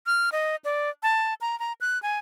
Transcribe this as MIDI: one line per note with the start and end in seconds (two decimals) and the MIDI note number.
0.06 0.30 89
0.32 0.56 75
0.65 0.90 74
1.03 1.34 81
1.41 1.58 82
1.59 1.73 82
1.81 2.01 90
2.02 2.19 80